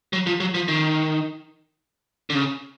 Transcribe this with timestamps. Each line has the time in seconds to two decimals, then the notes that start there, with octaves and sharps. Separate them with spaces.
0.13 F#3
0.27 F3
0.40 F#3
0.54 F3
0.68 D#3
2.30 D3
2.35 C#3